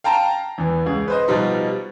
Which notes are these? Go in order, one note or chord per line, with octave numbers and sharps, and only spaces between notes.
F5 G5 A5 A#5
E2 E3
C#2 G#4
B4 C5 D#5
B2 F3 G3 D#4